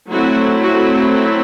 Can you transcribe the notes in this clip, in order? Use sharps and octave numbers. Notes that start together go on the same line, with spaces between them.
F#3 A3 C4 E4 F#4
F#4